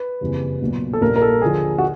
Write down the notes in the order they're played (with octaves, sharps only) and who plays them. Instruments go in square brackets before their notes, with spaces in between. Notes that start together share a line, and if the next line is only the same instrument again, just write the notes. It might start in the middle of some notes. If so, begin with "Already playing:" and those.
Already playing: [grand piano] B4
F#1 F2 C#3 E3 G3
B1 A#2 F#3
A4
A#1 A#2 G3 A#4
A#4
A4
D#2 D3 F3 G#4
F#4